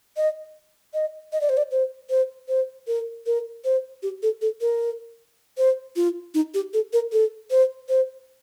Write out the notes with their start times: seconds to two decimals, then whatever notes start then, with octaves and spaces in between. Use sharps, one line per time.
0.17 D#5
0.94 D#5
1.33 D#5
1.41 D5
1.49 C5
1.57 D5
1.71 C5
2.10 C5
2.48 C5
2.87 A#4
3.26 A#4
3.65 C5
4.03 G4
4.23 A4
4.42 A4
4.61 A#4
5.58 C5
5.96 F4
6.34 D#4
6.54 G4
6.74 A4
6.93 A#4
7.12 A4
7.51 C5
7.89 C5